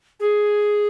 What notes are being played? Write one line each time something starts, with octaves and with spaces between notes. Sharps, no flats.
G#4